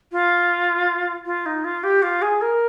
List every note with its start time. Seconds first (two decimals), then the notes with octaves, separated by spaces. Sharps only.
0.12 F4
1.25 F4
1.46 D#4
1.64 F4
1.83 G4
2.02 F4
2.22 G#4
2.41 A#4